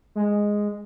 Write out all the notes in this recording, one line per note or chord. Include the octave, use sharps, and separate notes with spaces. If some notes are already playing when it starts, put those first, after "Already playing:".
G#3